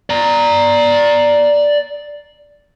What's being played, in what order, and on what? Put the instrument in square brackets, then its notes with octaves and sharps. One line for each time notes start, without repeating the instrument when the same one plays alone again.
[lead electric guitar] D5 A#5